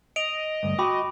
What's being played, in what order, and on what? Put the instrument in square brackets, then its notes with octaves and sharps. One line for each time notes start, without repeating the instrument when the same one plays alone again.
[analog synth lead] D#5 [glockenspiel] D7 F7
[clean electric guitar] D2 G2
[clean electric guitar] F#4 G5 [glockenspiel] B5 D6